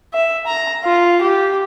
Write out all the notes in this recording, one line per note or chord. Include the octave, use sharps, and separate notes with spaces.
E5
A#5
F4
G4